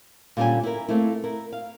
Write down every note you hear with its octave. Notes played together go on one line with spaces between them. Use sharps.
A#2 D3 G3 C#4 G5 G#5
E4 A#4
A3 A#3 C4 E4
E4 A#4
F5